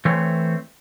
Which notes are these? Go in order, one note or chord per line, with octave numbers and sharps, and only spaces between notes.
E3 A3 C4 C#5